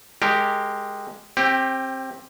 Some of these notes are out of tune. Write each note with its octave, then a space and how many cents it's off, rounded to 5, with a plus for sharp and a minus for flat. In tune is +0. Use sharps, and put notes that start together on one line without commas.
G#3 +0 G4 +0 A#4 -20
C4 +20 G4 +0